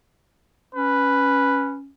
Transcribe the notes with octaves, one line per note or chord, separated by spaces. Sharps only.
C#4 B4